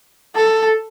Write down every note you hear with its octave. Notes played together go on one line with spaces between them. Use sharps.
A4